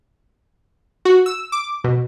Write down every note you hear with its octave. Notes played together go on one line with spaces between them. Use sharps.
F#4
E6
D6
B2